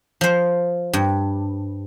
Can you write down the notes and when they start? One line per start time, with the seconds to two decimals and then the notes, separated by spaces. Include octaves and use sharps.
0.21 F3 C5
0.93 G2